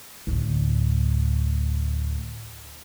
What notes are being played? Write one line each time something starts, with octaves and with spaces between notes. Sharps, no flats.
D2 A2